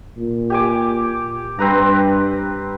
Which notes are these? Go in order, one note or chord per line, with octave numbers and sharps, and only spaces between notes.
A#2
G4 G#5 D6
G2 C4 B4 A#5